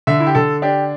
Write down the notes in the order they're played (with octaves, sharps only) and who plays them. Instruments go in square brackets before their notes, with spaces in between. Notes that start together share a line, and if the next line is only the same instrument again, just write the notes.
[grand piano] D3 E5
E4
G4
D3 A4
D4 G4